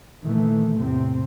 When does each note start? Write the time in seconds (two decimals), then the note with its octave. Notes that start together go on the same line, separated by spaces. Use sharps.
0.22 A#2 D#3 E3 A3
0.76 E2 A2 C3 C4